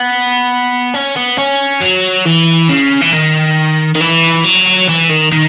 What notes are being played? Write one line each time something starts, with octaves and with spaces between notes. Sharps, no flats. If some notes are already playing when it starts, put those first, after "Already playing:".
Already playing: B3
C#4
B3
C#4
F#3
E3
C#3
E3
D#3
D#3
E3
F#3
E3
D#3
D#3